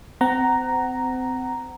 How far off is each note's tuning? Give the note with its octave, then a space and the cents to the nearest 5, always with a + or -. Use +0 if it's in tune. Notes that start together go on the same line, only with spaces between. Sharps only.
C4 -30 F#5 +25 A#5 +0